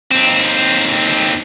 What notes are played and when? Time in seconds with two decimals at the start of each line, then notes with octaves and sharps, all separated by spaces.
0.11 D#2 C4